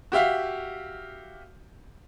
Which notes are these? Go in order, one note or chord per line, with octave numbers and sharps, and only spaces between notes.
F#4 G4 E5 F5